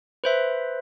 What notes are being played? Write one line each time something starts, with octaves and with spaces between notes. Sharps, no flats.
B4 C5 E5